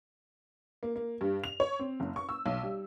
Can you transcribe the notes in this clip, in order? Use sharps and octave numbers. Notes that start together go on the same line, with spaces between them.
A#3
A#3
G2
F7
C#5
C4
F#1
C#6
E6
B1
G3